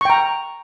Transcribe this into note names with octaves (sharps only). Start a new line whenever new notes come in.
G5 A#5 C#6